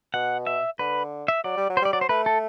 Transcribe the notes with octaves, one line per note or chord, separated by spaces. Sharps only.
B2 F#5
E5
D3 B4
E5
F#3 D5
G3
F#3
C5
G3 D5
F#3 D5
C5
A3 B4
A4